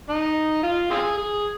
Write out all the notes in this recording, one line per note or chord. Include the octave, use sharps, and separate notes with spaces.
D#4
F4
C4 F4 G#4
G#4